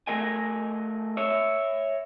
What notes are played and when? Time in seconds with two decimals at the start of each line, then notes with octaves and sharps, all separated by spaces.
0.07 A3 A#4 D#5 G#5
1.17 C#5 E5